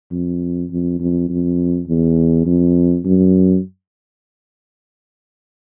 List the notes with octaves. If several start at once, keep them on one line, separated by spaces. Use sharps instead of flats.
F2
F2
F2
F2
E2
F2
F#2